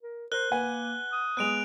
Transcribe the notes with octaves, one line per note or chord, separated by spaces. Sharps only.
A#4
A#4 C5 F#6 G7
A#3 B4 F#5 G#5
D#6
G#3 B3 F#6 D7 F7